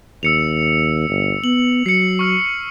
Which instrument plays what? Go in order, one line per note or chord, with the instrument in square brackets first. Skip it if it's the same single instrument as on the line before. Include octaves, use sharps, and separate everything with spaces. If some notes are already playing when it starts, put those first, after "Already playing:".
[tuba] D#2 [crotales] E6 C#7 F7
[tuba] G1
[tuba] B3 [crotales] F#7
[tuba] F#3 [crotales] C7 C#7
[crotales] C#6 F6